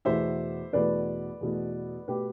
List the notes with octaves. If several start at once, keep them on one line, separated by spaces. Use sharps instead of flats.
E2 B2 A3 C5 E5
E2 B2 A3 B4 D5
E2 B2 A3
B2 A3 G4 B4